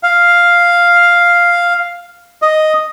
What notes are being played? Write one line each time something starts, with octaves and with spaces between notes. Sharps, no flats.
F5
D#5